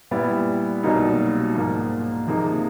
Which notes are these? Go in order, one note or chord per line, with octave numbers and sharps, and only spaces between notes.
A#2 G3 B3 E4
C2 B2 F#3 A#3 D#4
G#2 F3 A#3
C3 F3 A#3 D#4 G#4